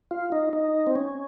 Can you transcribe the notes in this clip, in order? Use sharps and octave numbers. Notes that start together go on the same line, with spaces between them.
F4
D#4
D#4
C4
C#4